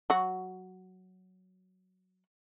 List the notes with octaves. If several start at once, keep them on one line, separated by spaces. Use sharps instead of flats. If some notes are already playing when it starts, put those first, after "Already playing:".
F#3 F#4